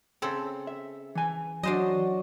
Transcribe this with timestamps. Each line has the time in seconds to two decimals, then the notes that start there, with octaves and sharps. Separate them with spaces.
0.22 C#3 C4 A4
0.67 E5
1.15 E3 G#5
1.63 F#3 D4 F#4 C5 D#5